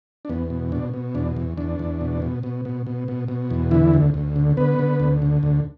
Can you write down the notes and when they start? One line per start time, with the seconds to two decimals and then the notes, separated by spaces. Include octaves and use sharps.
0.25 D4
0.29 E2 B3
0.50 B2
0.72 B2 D4
0.94 B2
1.15 E2 D4
1.36 E2
1.58 E2 D4
1.79 E2
2.01 B2
2.22 B2
2.43 B2
2.65 B2
2.87 B2
3.08 B2
3.28 B2
3.50 E2
3.71 D3 E3 E4
3.94 D2
4.14 D2
4.36 D3
4.57 D3 B3 B4
4.79 D3
5.00 D2
5.22 D3
5.43 D2